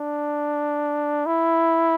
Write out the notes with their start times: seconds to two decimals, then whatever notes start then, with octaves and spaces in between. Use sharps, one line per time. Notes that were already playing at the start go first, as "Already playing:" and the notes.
Already playing: D4
1.26 E4